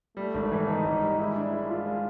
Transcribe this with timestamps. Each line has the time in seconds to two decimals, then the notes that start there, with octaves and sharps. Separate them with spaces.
0.17 G3 A3
0.34 G#1
0.52 E3
0.68 E3 D#4
0.84 G#1
1.02 G3
1.19 G#3 E4
1.36 D4
1.53 G#3
1.70 G#3 F4
1.86 G#3